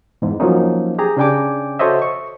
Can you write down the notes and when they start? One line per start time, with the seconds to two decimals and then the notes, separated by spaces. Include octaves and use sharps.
0.22 E2 G#2
0.40 F3 F#3 A#3 C#4 D#4
0.99 G4 G#4 A#5
1.17 C#3 C#4 D4 G5 G#5 D6
1.79 F#4 A4 C5 C#5 D#5 E5
2.02 C#6